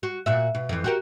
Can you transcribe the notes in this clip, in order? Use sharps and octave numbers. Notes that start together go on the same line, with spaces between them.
F#4
A#2 F#4 E5
B2
F2 E3
F#4 G4 A#4